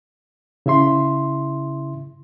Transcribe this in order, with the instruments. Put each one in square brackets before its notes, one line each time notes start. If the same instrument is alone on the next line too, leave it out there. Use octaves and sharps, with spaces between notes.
[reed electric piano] C#3 E4 E5 C6